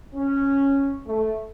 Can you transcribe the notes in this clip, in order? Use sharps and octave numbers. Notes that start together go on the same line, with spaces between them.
C#4
A3